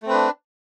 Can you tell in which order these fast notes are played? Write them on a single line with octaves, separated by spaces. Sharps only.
A3 C4 B4 D4